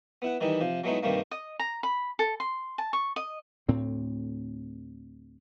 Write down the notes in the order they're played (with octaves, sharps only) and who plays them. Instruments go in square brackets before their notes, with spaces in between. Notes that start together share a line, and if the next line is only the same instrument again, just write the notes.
[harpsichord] B3 E4 F#5
D#3 E3 G3 D#4 E4
C3 F3
F#3 G#3 A3 B3 D#4 E4
G2 C3 D#3 G3 A3 A#3
[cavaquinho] D#5
A#5
B5
A4
C6
A5
C#6
D#5
[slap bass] D2 A2 C4